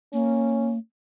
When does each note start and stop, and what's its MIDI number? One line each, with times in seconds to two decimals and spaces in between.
0.13 0.78 58
0.13 0.73 61